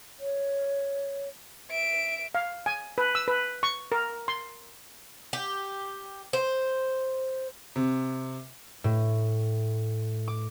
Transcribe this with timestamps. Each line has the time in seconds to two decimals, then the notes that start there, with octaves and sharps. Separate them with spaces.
0.20 C#5
1.71 E5 D7
2.35 F5
2.66 G#5
2.98 B4
3.15 E6
3.28 B4
3.63 C#6
3.92 A#4
4.28 C6
5.33 G4
6.33 C5
7.76 C3
8.84 A2
10.28 D6